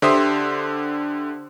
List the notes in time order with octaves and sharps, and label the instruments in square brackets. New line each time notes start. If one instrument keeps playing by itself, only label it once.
[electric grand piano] D3 G4 C5 E5 C6 D#6